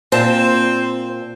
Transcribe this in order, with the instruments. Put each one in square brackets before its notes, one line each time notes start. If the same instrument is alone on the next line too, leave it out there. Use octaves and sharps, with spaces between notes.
[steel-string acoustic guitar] A#2 A5 [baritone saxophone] C4 [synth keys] C5